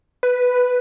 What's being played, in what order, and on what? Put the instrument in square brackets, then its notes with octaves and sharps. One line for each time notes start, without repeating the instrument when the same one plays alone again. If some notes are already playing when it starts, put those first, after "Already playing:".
[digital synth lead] B4